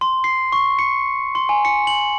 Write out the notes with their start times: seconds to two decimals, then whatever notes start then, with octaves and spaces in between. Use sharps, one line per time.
0.01 C6
0.24 C7
0.52 C#6
0.79 C#7
1.35 C6
1.49 G#5
1.65 C#7
1.87 F#7